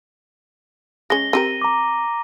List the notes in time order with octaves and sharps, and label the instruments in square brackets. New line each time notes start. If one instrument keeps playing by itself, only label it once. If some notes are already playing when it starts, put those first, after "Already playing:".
[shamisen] G#3 C#4 [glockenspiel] A#6 G7
[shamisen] C4 G4 A#4 [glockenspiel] A#6 D#7
[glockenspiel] A#5 D6